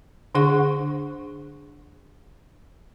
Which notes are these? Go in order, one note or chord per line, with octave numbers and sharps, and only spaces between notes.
D3 D4 G#4 F#5 C#6